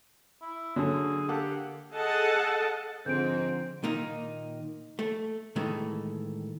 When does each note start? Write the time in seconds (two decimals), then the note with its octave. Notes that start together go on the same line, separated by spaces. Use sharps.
0.41 E4
0.76 D3 F#3 C#4 G#4 A4
1.28 A#3 G4 A4 F#5
1.91 G#4 A4 D#5 F#5 A5
3.06 G#2 D3 F3 C4 G6 D7
3.84 A#2 D#3 A#3 D#4
4.99 A3
5.56 A2 D#3 E3 G#3 A3